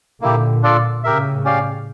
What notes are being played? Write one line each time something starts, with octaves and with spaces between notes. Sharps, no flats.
A#2 D3 A#3 E4 G4
D4 F4 A4 D5
A2 C#3 G4 A#4 E5
C#4 G4 D5 F5